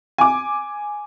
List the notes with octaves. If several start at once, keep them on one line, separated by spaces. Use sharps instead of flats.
G#5 D6